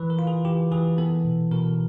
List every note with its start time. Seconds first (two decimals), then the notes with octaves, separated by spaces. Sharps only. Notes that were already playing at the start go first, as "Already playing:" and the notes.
Already playing: E3 B4
0.10 A#4
0.19 F4
0.27 G#4
0.45 E3 G4
0.72 E3 G#4
0.98 B3 A4
1.25 B2
1.51 B2 A#4